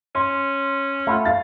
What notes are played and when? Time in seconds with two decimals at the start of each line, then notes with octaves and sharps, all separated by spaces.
0.15 C#4 C6
1.07 A3 F4 F#5 B5
1.25 F5 A6